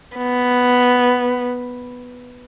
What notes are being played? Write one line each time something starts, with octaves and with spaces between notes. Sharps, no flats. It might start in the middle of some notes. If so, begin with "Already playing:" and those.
B3